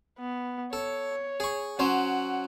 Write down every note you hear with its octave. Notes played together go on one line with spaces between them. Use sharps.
B3
A4 C#5
G#4 C#6
F#3 C#4 C5 F#5